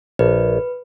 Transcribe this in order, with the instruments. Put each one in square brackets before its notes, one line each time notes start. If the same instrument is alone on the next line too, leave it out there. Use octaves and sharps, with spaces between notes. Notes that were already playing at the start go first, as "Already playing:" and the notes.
[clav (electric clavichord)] A#1 [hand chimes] B4